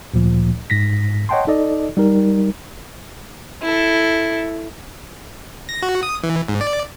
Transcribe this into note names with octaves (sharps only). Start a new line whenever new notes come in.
D2 A#2 F3
G#2 A#6 B6
C#5 D#5 F#5 G5 A5 C6
D#4 A4 D5 D#5
G3 D#4 A#4
E4 A4
A#6
F#4
D#6
E3
G#2
D5